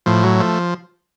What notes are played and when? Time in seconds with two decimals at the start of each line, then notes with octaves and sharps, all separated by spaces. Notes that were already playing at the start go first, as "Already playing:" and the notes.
0.06 A2 F3
0.24 F#3
0.40 F3 A3